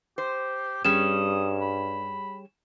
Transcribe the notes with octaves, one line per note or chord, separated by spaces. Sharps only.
G4 C5
G2 G3 C#4 G#4 D#6 E7
B5